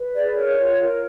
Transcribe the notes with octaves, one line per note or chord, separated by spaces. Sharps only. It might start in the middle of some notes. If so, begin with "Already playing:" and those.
Already playing: B4
G#4 D5
A#4 C#5
F4
A#4